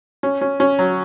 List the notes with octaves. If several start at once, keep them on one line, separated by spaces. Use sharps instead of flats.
C#4
C#4
C#4
F#3